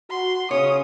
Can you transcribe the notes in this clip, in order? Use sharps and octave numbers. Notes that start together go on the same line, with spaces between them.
F#4 C6
C#3 C#4 C#5 D#6